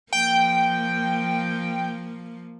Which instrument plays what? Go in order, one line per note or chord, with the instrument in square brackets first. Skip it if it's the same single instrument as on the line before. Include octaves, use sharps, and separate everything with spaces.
[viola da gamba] F3 A#3 [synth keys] G5